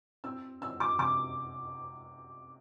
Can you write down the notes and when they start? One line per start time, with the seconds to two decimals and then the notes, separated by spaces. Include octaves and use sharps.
0.24 C4 E6
0.61 C4 E6
0.80 D6
0.99 C3 D6